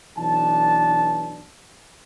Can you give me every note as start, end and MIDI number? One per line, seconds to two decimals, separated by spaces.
0.17 1.44 35
0.17 1.44 52
0.17 1.44 62
0.17 1.44 81